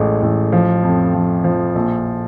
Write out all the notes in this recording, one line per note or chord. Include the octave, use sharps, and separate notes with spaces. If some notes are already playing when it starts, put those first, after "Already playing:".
Already playing: A1 A2 G#3
A1
F3
F2
F3
F3
A#1